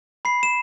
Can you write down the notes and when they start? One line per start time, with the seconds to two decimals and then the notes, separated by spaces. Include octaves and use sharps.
0.25 B5 C7
0.43 E7